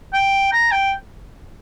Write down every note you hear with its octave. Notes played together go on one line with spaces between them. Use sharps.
G5
A#5
G5